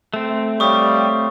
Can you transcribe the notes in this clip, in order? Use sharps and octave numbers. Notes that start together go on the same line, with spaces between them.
A3 C4
G3 C#5 F5 C#6 D#6